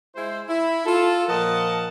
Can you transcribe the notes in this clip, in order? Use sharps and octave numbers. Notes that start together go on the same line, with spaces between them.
G#3 E4 C5
E4
F4 A4
A#2 F3 A#4 D#5 F#5 A5